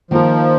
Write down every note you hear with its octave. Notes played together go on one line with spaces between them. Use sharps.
D#3 F3 A#3 D#4 A#4